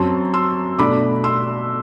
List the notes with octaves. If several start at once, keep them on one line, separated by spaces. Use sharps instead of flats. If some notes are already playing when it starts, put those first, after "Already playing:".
Already playing: F#2 F#3 C4 A5 C6
C6 E6
B2 A3 D4 B5 D6
C6 E6